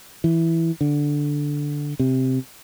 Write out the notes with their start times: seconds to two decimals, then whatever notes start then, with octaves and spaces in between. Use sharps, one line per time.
0.24 E3
0.81 D3
1.99 C3